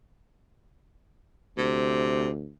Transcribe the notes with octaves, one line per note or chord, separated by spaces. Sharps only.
D2 C3